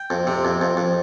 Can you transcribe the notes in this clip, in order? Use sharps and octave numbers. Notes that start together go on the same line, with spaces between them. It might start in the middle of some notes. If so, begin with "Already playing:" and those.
Already playing: G5
F2
C3
F2
F2
F2